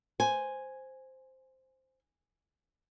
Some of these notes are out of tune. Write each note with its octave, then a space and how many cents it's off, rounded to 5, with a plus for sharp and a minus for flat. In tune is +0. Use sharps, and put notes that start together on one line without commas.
C5 +0 G#5 +0